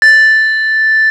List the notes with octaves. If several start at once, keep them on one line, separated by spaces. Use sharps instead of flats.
A6